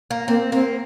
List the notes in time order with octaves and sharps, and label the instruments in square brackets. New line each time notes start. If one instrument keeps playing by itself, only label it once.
[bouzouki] A#3
[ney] A#3 [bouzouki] C4
[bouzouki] A#3 [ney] C4